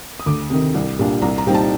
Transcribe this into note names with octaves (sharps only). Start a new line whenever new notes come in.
D#6
D2 D6
C3 D#3
C2
A#2 G3 D4
C2 A#5
A#5
A#2 G3 C4 D#4 G5
A5